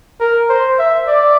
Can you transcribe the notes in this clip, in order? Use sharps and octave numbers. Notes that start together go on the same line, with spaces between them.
A#4
C5
E5
D5